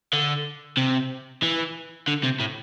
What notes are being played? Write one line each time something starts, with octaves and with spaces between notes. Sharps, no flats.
D3
C3
E3
D3
C3
A2